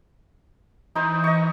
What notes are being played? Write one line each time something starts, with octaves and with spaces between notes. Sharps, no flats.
E3 D#4 C5
D#5 C#6